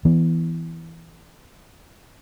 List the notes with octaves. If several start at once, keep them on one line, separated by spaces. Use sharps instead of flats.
E3 B3